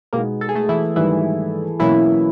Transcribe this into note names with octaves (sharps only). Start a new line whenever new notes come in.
B2 G#3 A#3 B3 D#4 A#4
A4
G#4
A3 A4
E3 E4
G#2 D#3 E3 G3 E4
B2 E3 F#3 A#3 C#4 E4